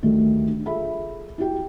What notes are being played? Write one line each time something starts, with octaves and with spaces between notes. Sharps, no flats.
D2 D#3 G3 A3
D4
F4 G#4 A4 E5 B5
E4 F#4 G4 G5